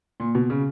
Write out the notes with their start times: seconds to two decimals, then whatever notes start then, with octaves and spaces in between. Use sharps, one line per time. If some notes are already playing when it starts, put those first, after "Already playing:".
0.20 A#2
0.35 B2
0.50 C#3